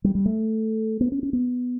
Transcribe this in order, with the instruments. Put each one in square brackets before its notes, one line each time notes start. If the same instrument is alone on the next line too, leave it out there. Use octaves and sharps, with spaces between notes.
[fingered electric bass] G3
G3
A3
B3
C#4
C#4
B3